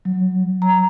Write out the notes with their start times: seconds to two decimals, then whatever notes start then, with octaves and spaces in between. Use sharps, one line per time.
0.05 F#3
0.62 A#5